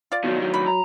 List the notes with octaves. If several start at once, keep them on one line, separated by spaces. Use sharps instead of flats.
F4 D5
C#2 B2 D#3 F#3
F#3
B5
A#5